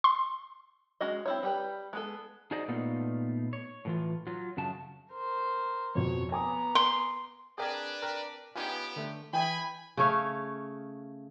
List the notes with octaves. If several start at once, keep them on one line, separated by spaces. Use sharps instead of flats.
C6
G#3 C#4 F#4 D#5
C4 E4 C#5
G3 G4 B4
G#3 B3 A4
D#4 F#4 G#4 C5 D5 D#5
A#2 A3 B3 D#4 F4
C#5
A2 E3 F4
F#3 F4
F#2 C#3 F#4 A5
A#4 C5
F2 B2 C#5
B3 G#5 A#5 D6 D#6
C6
C4 D4 G#4 A#4 B4 D5 F5 G#5
C4 A#4 F#6
B3 C#4 D#4 F4 G4 G#4 B4
D3 A3
E3 E4 G#4 G5 G#5 B5
C#3 A3 C#5 F5